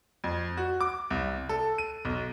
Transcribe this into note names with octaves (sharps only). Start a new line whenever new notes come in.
F2
F#4
D6
C2
A4
D#7
B1